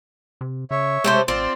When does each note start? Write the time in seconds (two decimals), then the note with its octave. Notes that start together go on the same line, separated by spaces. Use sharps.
0.41 C3
0.71 C#3 C#5 E5
1.04 C3 G#3 A3 C5
1.28 A1 C4 F4 D5 C6